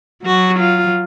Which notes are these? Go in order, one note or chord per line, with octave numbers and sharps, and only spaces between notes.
F#3 F#4
F4